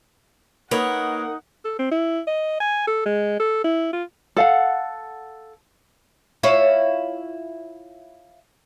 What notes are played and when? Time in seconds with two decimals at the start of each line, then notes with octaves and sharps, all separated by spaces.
0.71 A#3 D#4 B4 C#5 D#5 F#5
1.65 A4
1.79 C4
1.91 E4
2.27 D#5
2.60 G#5
2.87 A4
3.06 G#3
3.40 A4
3.64 E4
3.93 F4
4.36 A4 F5 F#5
6.43 E4 F4 C#5